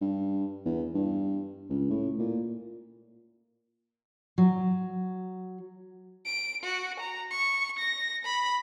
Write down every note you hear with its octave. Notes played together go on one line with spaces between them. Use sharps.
G2
E2
G2
C#2
A2
A#2
F#3
D7
F#4
A#5
C#6
A#6
B5